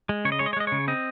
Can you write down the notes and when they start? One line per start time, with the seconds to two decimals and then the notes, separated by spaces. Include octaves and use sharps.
0.09 G#3
0.25 C#3 C#5
0.32 D#5
0.39 G#3 C#5
0.46 D#5
0.53 C#5
0.57 G#3 D#5
0.67 C#3 C#5
0.88 C4 D#5